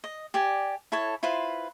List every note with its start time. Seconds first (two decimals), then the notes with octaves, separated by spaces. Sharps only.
0.04 D#5
0.34 G4 D5 G#5
0.92 E4 A4 C#5 A5
1.23 E4 F4 B4 C5